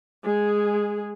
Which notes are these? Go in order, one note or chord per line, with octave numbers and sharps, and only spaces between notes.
G#3 G#4